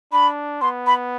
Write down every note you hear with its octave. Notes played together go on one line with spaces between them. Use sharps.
D4 B5
B3 C6
B5